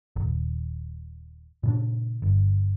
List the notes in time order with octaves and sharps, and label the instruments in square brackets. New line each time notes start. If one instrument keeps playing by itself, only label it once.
[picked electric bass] D#1 G#1
A#2 C#3 D4
G1